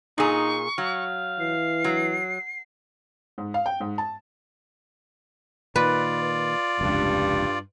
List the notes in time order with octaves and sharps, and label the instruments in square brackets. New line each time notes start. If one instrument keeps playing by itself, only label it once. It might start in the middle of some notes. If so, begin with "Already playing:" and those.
[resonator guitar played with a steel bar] A#2 G#4 [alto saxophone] D#4 [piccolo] C#6
[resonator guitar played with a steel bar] F#3 [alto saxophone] F5
[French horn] E3 [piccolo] C7
[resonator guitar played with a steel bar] F#3
[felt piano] G#2
F5
G5
G#2
A5
[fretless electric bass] A#2 D#3 [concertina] F4 D5 [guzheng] B4
[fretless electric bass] F1 C#2 [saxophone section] G2